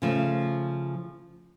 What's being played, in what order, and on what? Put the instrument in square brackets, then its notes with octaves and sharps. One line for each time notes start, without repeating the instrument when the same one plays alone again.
[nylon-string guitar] C#3 F3 A3